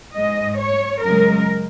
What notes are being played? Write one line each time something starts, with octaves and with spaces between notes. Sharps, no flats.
G#2 G#3 D#5
C#5
F#2 C#3 G#3 A#4